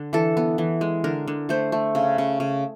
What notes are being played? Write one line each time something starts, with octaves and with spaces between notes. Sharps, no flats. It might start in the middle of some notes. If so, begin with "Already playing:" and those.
Already playing: D3
E3 A4
B3
E3
G#3
D3 A#4
D3
A3 C5
A3
C#3
C#3
C#3